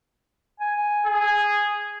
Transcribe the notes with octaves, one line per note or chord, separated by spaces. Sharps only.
G#5
G#4